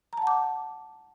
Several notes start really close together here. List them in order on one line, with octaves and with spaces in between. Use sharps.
A#5 A5 F#5 D6